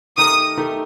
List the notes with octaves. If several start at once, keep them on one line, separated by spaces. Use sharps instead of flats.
D#3 A3 D#4 G4 A#4 D#6
D#3 A3 D#4 G4 A#4